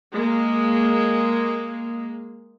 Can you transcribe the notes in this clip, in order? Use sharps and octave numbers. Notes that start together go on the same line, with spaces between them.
G#3 A#3